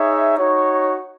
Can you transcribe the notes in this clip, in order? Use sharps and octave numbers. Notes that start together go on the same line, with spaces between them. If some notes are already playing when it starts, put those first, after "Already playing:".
Already playing: D#4 G#4 C#5 E5
D#4 F#4 C#5